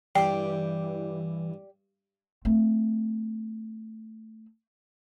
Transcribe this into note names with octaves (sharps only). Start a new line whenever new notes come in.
G2 E3 G4 D5 G5
A3 C4